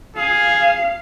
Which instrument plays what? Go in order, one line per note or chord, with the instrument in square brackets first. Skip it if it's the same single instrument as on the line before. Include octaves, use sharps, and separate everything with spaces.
[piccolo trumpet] G#4 [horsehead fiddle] F5